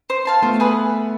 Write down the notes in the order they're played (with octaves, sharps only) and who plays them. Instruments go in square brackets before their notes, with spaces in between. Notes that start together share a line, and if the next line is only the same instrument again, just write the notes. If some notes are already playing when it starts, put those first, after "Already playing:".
[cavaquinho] C5
F5 A5 C6
[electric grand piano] A3 B3 [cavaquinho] F4
[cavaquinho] G#4 B4